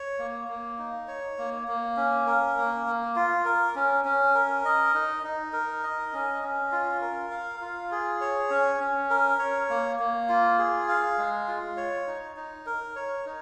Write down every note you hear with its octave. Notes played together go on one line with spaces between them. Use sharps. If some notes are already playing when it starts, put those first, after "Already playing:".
Already playing: C#5
A#3
A#3
D#4
C#5
A#3
A#3
C#4
A#4
A#3
A#3
F4
A#4
C#4
C#4
A#4
D#5
D#4
D#4
A#4
D#5
C#4
C#4
F4
A#4
F5
F4
G#4
C#5
C#4
C#4
A#4
C#5
A#3
A#3
F4
G#4
F5
G#3
F4
C#5
D#4
D#4
A#4
C#5
D#4